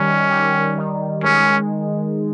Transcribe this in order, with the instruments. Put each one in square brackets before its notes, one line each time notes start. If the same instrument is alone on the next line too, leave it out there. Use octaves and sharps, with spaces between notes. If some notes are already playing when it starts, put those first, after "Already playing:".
Already playing: [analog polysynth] D#3 G3 [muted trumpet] C#4
[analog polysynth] G3
D#3
[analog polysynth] G#3 [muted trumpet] C#4